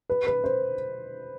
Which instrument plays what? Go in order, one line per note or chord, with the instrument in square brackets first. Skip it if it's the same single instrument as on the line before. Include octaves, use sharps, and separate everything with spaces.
[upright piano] B4
B4
C5